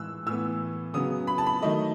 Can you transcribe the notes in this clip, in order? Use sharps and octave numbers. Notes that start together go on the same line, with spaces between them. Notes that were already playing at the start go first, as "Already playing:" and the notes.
Already playing: A2 E3 G#3 E6 F#6
A2 E3 B3 E6
C#3 F#3 B3 D#6
B5
A5
B5
D#3 F#3 A3 D#5